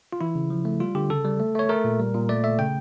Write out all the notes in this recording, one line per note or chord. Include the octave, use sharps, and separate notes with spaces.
F4
E3 E4
C#3
F3
A3
G3 F4
D3 G4
C#3 A4
G3
A3
A3 C#5
A3 A#4
A#2
G3
A#2
A3 D5
A3 E5
C#3 G5